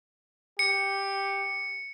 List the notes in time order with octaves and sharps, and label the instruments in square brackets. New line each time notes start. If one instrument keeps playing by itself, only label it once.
[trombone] G4 [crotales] C#7